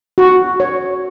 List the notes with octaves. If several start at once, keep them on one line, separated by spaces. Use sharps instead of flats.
F#4
C#5